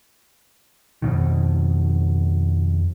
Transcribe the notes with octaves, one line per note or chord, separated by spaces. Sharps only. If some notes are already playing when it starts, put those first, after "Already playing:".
F2 B2 D#3